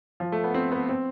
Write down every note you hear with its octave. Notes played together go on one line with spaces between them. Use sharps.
F3
A3
B3
C4
B3
C4